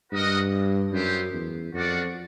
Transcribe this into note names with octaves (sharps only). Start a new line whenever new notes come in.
G2 F#4 A#4 D#5 F#5
F#2 B3 E4 G4 C5
E2
F2 D4 F#4 A#4 D5 F#5